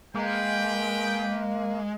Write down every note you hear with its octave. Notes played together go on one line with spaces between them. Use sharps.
G#3 A#3 B4 G5